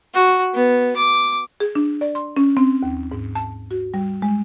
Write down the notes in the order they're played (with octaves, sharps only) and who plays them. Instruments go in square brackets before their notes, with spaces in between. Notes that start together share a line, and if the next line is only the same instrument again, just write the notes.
[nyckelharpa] F#4
B3
D6
[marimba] G#4
D4
D5
C6
C#4
C4
D#2
G#2
A5
F#4
G3
G#3